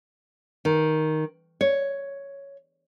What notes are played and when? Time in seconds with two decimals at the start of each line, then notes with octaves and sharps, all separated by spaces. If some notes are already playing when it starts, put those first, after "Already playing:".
0.65 D#3
1.61 C#5